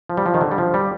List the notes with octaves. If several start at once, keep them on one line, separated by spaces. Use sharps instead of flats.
F3
G3
F3
D#3
D3
G3
F3
G3